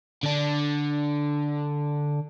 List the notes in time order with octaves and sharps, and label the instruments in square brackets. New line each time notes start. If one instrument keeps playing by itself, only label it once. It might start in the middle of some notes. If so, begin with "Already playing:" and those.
[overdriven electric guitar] D3 D4